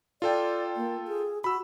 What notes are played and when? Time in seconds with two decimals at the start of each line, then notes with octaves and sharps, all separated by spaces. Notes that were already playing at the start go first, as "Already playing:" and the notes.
0.22 F4 A4 D5 G5
0.76 A#3
1.08 G#4
1.44 F#4 B5 E6